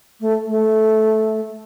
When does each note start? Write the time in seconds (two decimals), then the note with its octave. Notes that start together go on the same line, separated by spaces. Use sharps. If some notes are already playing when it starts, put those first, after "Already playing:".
0.21 A3
0.47 A3